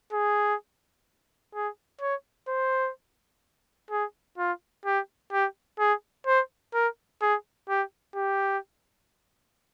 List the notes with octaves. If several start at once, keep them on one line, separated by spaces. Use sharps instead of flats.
G#4
G#4
C#5
C5
G#4
F4
G4
G4
G#4
C5
A#4
G#4
G4
G4